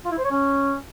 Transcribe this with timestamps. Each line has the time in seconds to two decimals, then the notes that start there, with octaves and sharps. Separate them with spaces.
0.05 F4
0.12 E4
0.18 C5
0.24 C#5
0.31 C#4